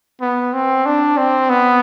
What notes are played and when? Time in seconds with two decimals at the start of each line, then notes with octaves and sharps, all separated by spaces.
0.21 B3
0.53 C4
0.85 D4
1.17 C4
1.50 B3